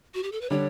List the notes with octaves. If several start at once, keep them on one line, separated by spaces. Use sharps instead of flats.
F#4
G4
A4
B4
D3 G3 D4 C#5